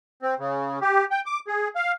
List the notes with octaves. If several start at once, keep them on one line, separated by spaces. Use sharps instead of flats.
C4
C#3
G4
G5
D6
G#4
F5